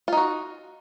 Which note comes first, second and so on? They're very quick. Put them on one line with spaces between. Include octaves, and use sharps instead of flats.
F4 D#4 F#4